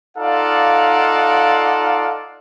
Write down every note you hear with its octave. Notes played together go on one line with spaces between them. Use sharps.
D#4 F4 A4 D5 F5 F#5